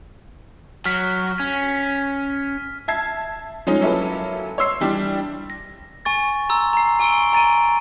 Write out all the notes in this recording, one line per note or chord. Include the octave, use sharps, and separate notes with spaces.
F#3 F6 B6
C#4
E5 A5 G#6 C7
F3 G#3 C#4 D#4
F#3 A#3 C#4 E4 A4 B4
C#5 C6 E6 C7
E3 G3 D4 D5
A#6
G#5 C#6 A6
A#5 C6 E6
A#5 C7
G#5 C#6 E6 D7 G7
G#5 A#5 A6 D7 D#7